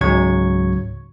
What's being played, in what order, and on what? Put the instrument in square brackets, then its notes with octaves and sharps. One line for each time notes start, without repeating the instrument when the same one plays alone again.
[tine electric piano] C#2 G#2 C#3 F#3 C#6 G#6